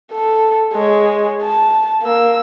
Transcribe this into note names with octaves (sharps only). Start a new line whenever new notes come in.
A4
G#3 C#5
A5
A#3 E6